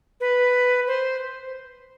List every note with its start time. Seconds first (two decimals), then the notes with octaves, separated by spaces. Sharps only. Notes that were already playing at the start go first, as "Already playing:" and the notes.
0.20 B4
0.87 C5